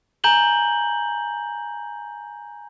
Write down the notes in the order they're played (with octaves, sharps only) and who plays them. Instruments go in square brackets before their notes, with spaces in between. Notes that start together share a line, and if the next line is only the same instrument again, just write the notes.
[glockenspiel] G#5 A#5 G6 F#7 G7